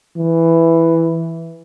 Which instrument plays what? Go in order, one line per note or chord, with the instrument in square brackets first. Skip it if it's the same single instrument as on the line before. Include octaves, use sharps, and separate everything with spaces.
[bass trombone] E3